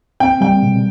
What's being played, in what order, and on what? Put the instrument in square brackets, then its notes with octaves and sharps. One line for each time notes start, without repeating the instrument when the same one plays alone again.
[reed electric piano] C4 [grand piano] G5
[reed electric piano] G3 [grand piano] G5
[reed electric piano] B2